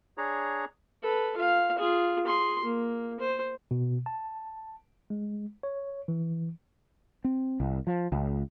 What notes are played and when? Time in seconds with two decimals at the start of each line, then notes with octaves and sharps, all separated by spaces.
0.18 D4 G#4 C#5 A#5
1.03 A4 B4
1.37 F4 F5
1.79 F4 G#4
2.26 G#4 C6
2.64 A#3
3.20 C5
3.71 B2
4.06 A5
5.10 G#3
5.63 C#5
6.08 E3
7.24 C4
7.60 C2
7.87 F3
8.12 C#2